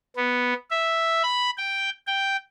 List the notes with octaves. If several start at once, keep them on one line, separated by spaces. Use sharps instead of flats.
B3
E5
B5
G5
G5